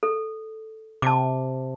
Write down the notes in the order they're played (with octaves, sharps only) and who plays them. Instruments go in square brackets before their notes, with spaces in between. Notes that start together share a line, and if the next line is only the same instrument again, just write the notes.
[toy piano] A4
[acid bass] C3 [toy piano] A5 D6